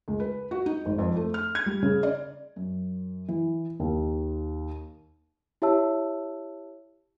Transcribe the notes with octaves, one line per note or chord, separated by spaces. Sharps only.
C#2
B4
F#4
D#4
G#1
F2
A3
F6
G#6
G3
C#3
D5
F#2
E3
D#2
E4 G4 C#5 E5 A5 E6